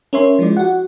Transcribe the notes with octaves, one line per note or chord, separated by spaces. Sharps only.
C#4 A#4 C#5 E5 C6
F3 G#3 E4 D5
F#4 F#5